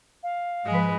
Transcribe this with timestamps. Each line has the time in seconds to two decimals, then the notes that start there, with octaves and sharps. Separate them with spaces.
0.23 F5
0.66 G#2 F3 G#3 B4